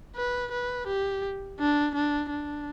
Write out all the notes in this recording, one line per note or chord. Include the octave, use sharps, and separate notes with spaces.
B4
B4
G4
D4
D4
D4